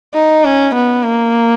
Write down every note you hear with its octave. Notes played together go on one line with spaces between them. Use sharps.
D#4
C#4
B3
A#3